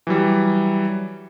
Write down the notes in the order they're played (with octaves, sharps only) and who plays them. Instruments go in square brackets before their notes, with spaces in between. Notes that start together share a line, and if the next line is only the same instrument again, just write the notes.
[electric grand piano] E3 F#3 G3